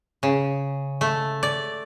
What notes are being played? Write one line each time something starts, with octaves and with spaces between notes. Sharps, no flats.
C#3
A3
D5